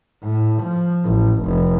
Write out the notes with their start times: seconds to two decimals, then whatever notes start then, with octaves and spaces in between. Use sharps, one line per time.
0.23 A2
0.63 F3
1.04 A1
1.43 F1